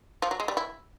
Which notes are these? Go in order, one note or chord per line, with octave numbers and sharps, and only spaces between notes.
F3
F#3
G#3
G3
E4